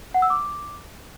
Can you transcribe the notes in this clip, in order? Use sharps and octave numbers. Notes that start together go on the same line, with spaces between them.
F#5
E6
D6